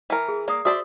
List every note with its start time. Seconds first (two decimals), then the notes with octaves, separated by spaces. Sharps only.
0.10 E3 A#4
0.28 G#4
0.48 A#3 D5 D#6
0.65 F#4 C5 D5 E5 D#6